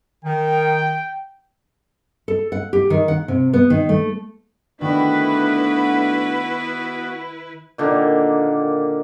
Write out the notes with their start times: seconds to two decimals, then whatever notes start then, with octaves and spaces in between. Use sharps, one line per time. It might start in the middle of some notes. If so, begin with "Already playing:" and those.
0.25 D#3 G5
2.28 A4
2.52 F#5
2.73 G4
2.90 D#3
3.08 F#5
3.28 C3
3.53 B3
3.70 D#3
3.89 A3
4.81 D#3 A3 B3 D4 E4 F#4 B4
7.78 A#2 D3 D#3 A#3